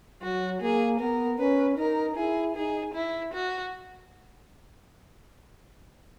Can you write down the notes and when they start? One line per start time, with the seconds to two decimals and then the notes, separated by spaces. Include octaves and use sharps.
0.22 F#3 F#4
0.61 A#3 G#4
1.00 B3 A#4
1.39 C#4 B4
1.77 D#4 A#4
2.16 E4 G#4
2.55 D#4 G#4
2.95 E4
3.34 F#4